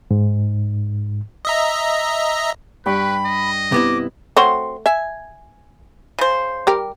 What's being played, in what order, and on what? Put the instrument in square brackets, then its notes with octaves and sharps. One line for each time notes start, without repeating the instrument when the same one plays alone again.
[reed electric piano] G#2
[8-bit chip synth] D#5 E5 A#5
[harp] G2 G5 C#6 [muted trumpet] B4 [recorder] B5
[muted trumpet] D#5
[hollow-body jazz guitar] C3 B3 E4 [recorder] D6
[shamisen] A3 C#5 F#5 [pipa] C4 F#4 C6
[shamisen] E5 [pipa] G#5
[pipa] C#3 C5
[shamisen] G3 G4 A#4